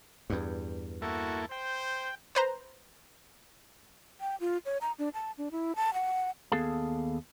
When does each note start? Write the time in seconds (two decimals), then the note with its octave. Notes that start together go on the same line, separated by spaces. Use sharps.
0.30 E2 G2
1.02 A#3 E4 F#4 A4
1.51 C5 G5
2.35 B4 C5 A#5
4.21 G5
4.40 F4
4.66 C#5
4.81 A#5
4.99 D4
5.14 A5
5.38 D4
5.52 E4
5.76 A5
5.94 F#5
6.52 D#2 B3 G#4 A4 F5 A5